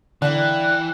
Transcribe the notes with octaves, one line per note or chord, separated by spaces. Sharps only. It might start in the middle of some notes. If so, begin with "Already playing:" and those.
D3 E3 G3 A#3 E4 F#6